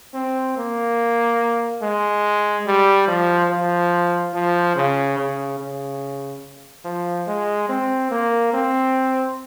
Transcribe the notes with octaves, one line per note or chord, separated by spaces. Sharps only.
C4
A#3
G#3
G3
F3
F3
F3
C#3
C#3
C#3
F3
G#3
C4
A#3
C4